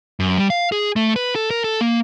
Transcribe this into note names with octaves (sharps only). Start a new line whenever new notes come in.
F#2
G3
F5
G#4
A3
B4
A4
A#4
A4
A#3